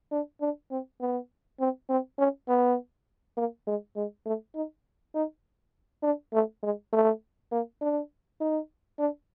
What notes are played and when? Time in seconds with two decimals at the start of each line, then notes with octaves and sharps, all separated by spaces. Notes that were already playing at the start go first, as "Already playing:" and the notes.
0.11 D4
0.41 D4
0.71 C4
1.00 B3
1.60 C4
1.89 C4
2.19 C#4
2.49 B3
3.37 A#3
3.67 G#3
3.96 G#3
4.26 A3
4.55 D#4
5.15 D#4
6.03 D4
6.33 A3
6.63 G#3
6.93 A3
7.52 A#3
7.81 D4
8.41 D#4
8.99 D4